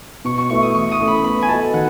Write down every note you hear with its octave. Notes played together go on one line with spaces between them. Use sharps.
B2 C#6
C#6
A3 E4 B4 E5 C#6
D#6
E3 C#6
D#6
A3 C#4 E4 A4
B5
B3 B5
G#5
F#4 A4 D#5 A5
D#3 F#5